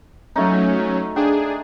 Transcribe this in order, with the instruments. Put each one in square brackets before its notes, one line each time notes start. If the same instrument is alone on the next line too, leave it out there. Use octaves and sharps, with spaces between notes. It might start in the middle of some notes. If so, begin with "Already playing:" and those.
[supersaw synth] F#3 C#4 [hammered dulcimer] A3 D#4
[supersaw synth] D4 G#4 [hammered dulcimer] G5